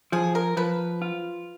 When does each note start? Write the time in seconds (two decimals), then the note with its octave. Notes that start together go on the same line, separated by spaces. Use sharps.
0.12 F3 G#4
0.35 A#4
0.57 F3 B4
1.02 F4